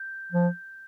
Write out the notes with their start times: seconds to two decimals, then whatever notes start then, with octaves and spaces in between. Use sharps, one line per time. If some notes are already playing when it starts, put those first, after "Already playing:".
Already playing: G6
0.32 F3